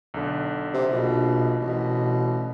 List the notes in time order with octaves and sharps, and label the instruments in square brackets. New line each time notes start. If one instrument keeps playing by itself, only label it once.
[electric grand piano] B1 D3
[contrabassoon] C3
[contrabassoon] A#1 [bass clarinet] B2
[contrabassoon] A1 [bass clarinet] B2